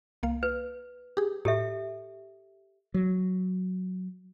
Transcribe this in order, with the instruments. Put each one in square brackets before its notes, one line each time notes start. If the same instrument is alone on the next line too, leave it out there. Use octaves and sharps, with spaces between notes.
[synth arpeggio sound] C2 A#3 F5
[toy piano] B4
[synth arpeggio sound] G4 G#4
[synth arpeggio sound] A2 [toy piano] G4 A4 E5
[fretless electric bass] F#3